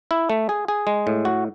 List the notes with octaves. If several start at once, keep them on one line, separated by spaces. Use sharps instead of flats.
E4
A3
G#4
G#4
G#3
A2
F#4